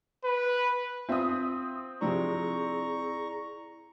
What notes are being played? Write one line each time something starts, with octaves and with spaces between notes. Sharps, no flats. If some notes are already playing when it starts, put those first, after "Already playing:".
B4
C4 F4 E5 D#6
C3 F3 D4 E4 G#4 D5 A#5 C#6